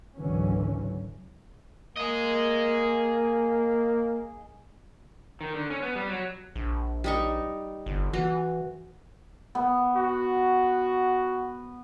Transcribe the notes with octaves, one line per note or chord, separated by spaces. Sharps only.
G#1 C#2 D3 E3 F#3 C#4
A#3 G#4 D#5
D#3
D3
C#4
B3
G3
F#3
A#1
G3 D#4 C#6
G1
E3 F#4
B3
F#4